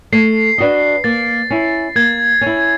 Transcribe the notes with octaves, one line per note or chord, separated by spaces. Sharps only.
A3 C7
D4 F#4 B4 D#5
A#3 A6
C#4 E4
A#3 G#6
C#4
E4